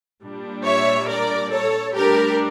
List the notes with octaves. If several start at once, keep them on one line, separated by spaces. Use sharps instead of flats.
A#2 G3 D4
C#5 E5
A#4 D5
A4 C#5
A2 G3 D4 G4 A#4